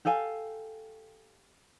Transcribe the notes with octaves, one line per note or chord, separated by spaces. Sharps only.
G4 A4 F5 G#5